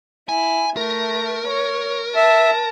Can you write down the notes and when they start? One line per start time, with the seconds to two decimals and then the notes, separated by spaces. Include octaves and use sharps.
0.29 E4 G#5
0.77 A3 A#4
1.47 C#5
2.15 E5 A5